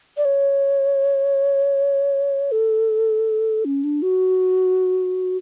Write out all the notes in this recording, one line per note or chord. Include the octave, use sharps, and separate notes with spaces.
D5
C#5
A4
C#4
D4
F#4